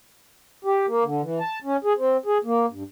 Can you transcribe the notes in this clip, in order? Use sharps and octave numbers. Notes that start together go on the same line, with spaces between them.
G4
A#3
D3
E3
A5
C#4
G#4
C4
G#4
A#3
G2